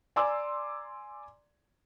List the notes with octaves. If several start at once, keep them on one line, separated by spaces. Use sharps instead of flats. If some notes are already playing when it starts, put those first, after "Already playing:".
D5 G#5 A#5 C6 D6 E6